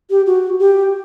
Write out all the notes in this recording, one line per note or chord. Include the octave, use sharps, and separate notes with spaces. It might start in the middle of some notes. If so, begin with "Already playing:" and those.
G4
F#4
G4